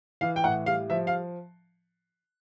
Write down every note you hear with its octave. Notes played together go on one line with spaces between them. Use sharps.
E3 F5
G5
A2 F#5
G3 F5
F3 E5
F5